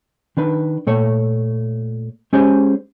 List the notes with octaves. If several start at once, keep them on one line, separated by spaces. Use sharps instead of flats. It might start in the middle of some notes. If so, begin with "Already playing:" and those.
D#3 D4 B4
A#2 A3 C#5
G#3 C#4 G4 G#4 C5 C#5